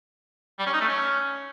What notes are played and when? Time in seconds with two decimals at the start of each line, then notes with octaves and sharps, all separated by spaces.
0.59 G3
0.66 C#4
0.73 D#4
0.81 A3
0.88 C#4